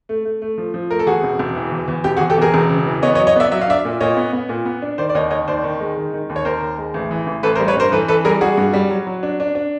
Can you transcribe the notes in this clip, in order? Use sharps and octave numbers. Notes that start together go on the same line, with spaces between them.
A3
A3
A3
F3
F3
A3 A#4
A4
E2 F#4 G#4
E1
E1
E3
E2
E2
E1 G4
F#4 G#4
E2
G4 A4
E2 G#4 A#4
E1
C#3
E3
B3 C#5 D#5
C#5 D#5
F#3
C#5 D#5
B3 D5 E5
F#3 E5
F5
D4 D5 E5
A#2
A#2 C#5 D#5
B3
B3
A#2
B3
D4
D#3 C5 D5
D5
D#2 C#5 D#5
D#3 C#5 D#5
D#2 C5 D5
D#3
G#3
D#3
D#3
D#2
C#5
D#2 A#4 C5
D#2
G#3
A1
E3
A1
A1 A4 B4
A#4 C5
G3
B4 C#5
G2 A#4 C5
E3 A4 B4
E3 A4 B4
G3 G#4 A#4
G3 F#4 G#4
G2
G3
F#3
F#3
D4
D4
D4